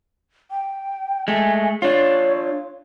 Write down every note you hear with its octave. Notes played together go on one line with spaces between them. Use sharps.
G5
G#3 A3 G#5
D4 F4 C#5